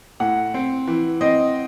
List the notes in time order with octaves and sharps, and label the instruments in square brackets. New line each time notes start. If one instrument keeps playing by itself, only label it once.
[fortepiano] A2 [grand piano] F#5
[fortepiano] C4
E3
[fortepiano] C4 [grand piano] D#5